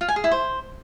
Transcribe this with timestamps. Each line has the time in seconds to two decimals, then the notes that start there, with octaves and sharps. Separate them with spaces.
0.01 F4
0.08 G#5
0.16 G#4
0.24 E4
0.31 C5